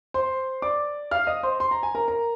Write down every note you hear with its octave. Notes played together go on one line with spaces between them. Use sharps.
C5 C6
D5 D6
F5 F6
D#5 D#6
C5 C6
C6
A#5
G#5
A#4 A#5
A#4 A#5